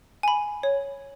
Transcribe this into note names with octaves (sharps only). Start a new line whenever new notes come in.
G#5 B5
C#5